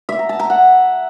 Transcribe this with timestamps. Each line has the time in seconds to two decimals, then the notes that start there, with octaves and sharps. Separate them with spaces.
0.09 E5
0.19 A#5
0.29 A5
0.39 A#5
0.50 F#5